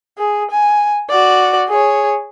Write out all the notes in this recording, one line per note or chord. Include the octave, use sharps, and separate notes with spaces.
G#4
G#5
F#4 D5
G#4 C#5